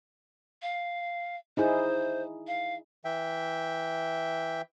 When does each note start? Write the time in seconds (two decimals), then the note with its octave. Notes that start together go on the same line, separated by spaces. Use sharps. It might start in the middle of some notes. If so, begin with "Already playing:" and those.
0.62 F5
1.57 D#4 E4 G#4 C5
2.47 F5
3.05 E3 E5 G5